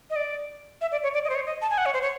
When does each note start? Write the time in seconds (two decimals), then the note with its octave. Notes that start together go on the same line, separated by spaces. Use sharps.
0.10 D#5
0.16 D5
0.81 E5
0.92 D5
1.03 C#5
1.14 D5
1.25 D#5
1.30 C5
1.35 C#5
1.46 D#5
1.62 A5
1.70 G#5
1.78 F#5
1.86 C#5
1.94 C5
2.02 C#5